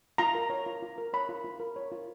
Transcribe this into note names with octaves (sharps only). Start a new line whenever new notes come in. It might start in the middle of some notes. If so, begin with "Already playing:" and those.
F4 A#5
A#4
C#5
F4
F4
A#4
C#5 B5
F4
F4
A#4
C#5
F4